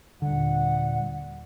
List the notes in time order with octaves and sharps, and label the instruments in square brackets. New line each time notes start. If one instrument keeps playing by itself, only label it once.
[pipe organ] D#2 A#2 G3 [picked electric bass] D3 [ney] F#5